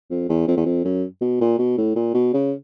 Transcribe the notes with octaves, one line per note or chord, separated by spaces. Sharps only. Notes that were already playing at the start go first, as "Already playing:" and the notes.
F2
E2
F2
E2
F2
F#2
B2
A#2
B2
A2
A#2
B2
C#3